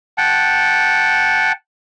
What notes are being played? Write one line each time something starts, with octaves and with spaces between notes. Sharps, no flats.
F#5 G5 A5